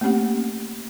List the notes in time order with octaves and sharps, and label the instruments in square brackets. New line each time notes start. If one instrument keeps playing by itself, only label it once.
[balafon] A3 A#3 C4 C#4 G4 F#5